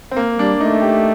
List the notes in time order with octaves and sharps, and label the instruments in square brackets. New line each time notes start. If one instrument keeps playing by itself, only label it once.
[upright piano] C4
A#3
[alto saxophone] G3 [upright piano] D4
[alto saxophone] A3 [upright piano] D#4
[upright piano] G4